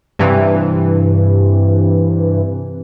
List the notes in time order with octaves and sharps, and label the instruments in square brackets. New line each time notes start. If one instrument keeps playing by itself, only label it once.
[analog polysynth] G2 C3 E3